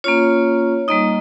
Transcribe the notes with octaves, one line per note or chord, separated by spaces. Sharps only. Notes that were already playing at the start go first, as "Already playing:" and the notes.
A#3 C#4 F4 C#5
G3 A#3 D#4 D#5